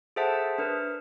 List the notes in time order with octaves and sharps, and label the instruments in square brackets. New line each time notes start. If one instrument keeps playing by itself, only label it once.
[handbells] G#4 A4 C5 E5 F#5 A5
D4 A#4 B4